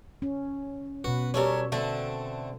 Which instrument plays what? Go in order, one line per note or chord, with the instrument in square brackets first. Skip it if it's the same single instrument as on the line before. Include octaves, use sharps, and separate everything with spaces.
[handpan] C#4
[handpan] B2 B4 [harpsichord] F#4
[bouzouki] G3 A4 C#5 [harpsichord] C#4 A#4
[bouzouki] D3 C4 [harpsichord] A3